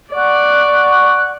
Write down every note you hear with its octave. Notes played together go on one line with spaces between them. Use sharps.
D5 F#5 C#6 F#6